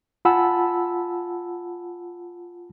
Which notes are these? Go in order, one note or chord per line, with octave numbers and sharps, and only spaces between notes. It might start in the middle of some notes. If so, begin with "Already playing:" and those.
F4 F#5 G#5 A5 B5 E6